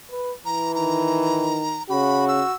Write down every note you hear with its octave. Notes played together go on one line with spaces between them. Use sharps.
B4
E3 A#5
D#3 A#5
C#3 F#4 B5
E6